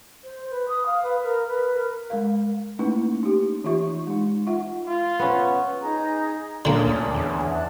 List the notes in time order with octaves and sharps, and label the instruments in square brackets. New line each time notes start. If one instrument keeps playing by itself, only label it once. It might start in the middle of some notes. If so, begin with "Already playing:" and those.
[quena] C5
B4
D#6
F5
B4
A#4
B4
A#4
[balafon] G#3 A#4 F5
A3 A#3 C#4 D#4 E4 B4
D#4 G4
E3 D#4 F4 G4 E5 C#6
G#3 D#4
F4 E5 F#5
[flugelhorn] F4
[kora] B3 C#4
[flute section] D#4 G#4 A#5
[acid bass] A#2 [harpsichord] D3 A#3 [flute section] C#4 D4 G#4
[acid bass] D2
E2
[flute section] D5 A5 F#6